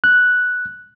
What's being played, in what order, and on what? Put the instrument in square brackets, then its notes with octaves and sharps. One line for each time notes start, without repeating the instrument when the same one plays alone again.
[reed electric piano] F#6